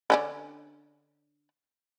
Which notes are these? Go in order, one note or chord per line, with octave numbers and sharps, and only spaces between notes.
D3 C#4 D4